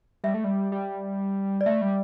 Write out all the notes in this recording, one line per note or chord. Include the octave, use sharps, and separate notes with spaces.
G3 E5
A3
G3
G3
D5
A3 E5
G3